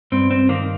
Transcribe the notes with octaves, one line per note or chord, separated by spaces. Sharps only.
G2 C4
C4
D#3 A#3